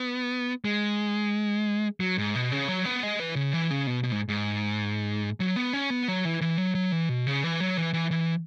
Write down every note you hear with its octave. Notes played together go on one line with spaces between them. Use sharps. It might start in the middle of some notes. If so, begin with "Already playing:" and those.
Already playing: B3
G#3
F#3
G#2
B2
C#3
F#3
B3
G#3
E3
C#3
E3
C#3
B2
B2
G#2
G#2
F#3
B3
C#4
B3
F#3
E3
E3
F#3
F#3
E3
B2
C#3
E3
F#3
E3
E3
E3